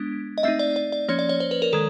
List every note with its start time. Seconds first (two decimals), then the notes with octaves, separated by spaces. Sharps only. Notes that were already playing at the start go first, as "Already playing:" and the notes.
Already playing: G#3 B3 D4
0.38 D#5
0.43 A3 C4 D#4 E5
0.59 D5
0.76 D5
0.92 D5
1.08 F3 A#3 C#4 C#5
1.19 D5
1.29 C#5
1.40 C5
1.51 B4
1.62 A#4
1.73 D#3 G#3 A4